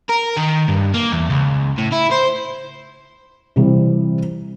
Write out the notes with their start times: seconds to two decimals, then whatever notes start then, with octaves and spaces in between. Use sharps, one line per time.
0.10 A#4
0.37 D#3
0.68 G2
0.94 A#3
1.12 E2
1.30 C#2
1.78 A2
1.92 E4
2.11 C5
3.56 C3 E3 G3 C4